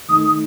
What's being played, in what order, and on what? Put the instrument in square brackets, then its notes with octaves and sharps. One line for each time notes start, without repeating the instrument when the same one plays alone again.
[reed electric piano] D#3 A3 D#4 [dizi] D#6
[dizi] D#6